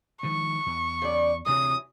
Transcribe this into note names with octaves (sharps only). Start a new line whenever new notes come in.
D#3 F3 G#3 C#6
E2
C#3 D5
D2 C3 E3 F#3 D#6